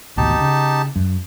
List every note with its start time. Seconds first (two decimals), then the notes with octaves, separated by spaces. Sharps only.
0.17 G#1 D2 B2 D#4 G4 A5
0.41 C#3
0.96 F#2